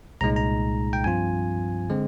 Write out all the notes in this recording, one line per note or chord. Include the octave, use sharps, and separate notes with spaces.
C2 A#2 G#3 D#4 A#5
A#5
G5
G2 F3 C4 F4 G#5
D3 G#3 C4